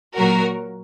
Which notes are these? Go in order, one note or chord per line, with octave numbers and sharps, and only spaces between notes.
A#2 F#3 F#4 A#4